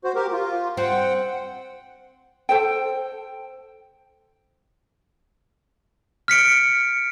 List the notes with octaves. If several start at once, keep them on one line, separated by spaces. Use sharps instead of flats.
F#4 C5
G4 A#4
F4
C4 F#5 G5
A4 C5 G5
F6 B6 C#7 D7